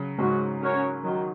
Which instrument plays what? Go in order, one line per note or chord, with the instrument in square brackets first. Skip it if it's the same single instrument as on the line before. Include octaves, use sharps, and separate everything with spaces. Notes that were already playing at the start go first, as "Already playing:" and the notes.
Already playing: [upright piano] C#3 F#3
[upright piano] G#2 C#3 [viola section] G#3 C#4 F#4
[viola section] C#4 F#4 A#4 C#5
D#3 F#3